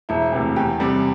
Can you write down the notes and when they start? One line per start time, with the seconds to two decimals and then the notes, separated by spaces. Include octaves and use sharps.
0.09 E1 E4
0.33 D2 C3 E3
0.56 E2 G4
0.80 C3 G3